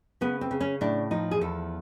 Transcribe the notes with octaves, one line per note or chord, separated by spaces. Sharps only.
C#3 B3
C4
C#3
C#4
A2 D4
F3 D#4
G#4
E2 A4